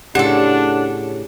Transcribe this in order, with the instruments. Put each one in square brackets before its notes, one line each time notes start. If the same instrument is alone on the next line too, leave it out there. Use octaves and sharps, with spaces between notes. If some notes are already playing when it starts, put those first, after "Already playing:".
[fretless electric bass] A2 C#3 [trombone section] D4 [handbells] G4 [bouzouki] A4 F#5